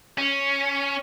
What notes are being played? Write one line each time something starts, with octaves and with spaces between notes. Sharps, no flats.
C#4